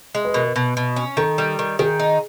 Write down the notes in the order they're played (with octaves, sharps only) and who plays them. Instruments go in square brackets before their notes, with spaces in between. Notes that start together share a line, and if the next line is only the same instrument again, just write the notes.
[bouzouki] G#3
[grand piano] B4
[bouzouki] B2 [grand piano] A#4
[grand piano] B4
[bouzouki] B2
B2
C#4
[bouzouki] D#3 [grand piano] A4
[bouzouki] G3
D#3
[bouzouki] D#3 [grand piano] G#4
[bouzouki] D#4